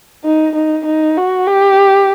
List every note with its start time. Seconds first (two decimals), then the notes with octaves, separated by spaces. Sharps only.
0.25 D#4
0.55 D#4
0.86 D#4
1.17 F#4
1.47 G4